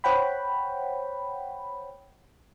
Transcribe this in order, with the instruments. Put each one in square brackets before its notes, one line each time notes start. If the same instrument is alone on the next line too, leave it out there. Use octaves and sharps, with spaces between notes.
[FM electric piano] C5 C#5 F#5 G5 B5